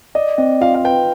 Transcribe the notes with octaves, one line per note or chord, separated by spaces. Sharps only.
D5 D#5
C4 D#5
F4 F5
F5
B4 G5